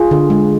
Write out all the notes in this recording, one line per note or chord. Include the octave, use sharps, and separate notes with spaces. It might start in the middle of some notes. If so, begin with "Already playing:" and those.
Already playing: F4 G#4
D3
G#3